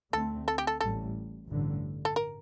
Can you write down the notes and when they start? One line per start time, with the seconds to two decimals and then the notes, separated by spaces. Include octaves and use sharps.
0.13 D2 D3 A3 C4 A4
0.48 A4
0.58 G4
0.67 A4
0.81 A1 A2 G3 A4
1.48 A1 G2 D3
2.05 A4
2.16 A#4